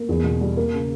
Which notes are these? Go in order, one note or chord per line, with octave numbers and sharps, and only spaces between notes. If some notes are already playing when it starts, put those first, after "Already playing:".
Already playing: A#3
E2
B2
G3
A#3
C#3